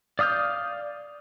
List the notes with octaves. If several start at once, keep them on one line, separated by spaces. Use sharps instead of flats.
D5 F5 D#6 F6 G6